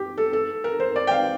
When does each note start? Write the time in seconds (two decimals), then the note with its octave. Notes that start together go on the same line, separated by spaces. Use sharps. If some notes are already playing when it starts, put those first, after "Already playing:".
Already playing: G4
0.17 A4
0.33 A4
0.64 A#4
0.80 C5
0.96 D5
1.07 G5
1.11 F5